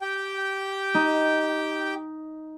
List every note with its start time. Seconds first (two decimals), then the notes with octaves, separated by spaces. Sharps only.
0.01 G4 G5
0.94 D#4